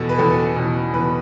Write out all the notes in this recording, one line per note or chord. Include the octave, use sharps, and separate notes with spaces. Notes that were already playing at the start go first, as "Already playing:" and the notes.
Already playing: E2 B2 A4
B4
E2 B2 A4
E2 B2
E2 B2 B4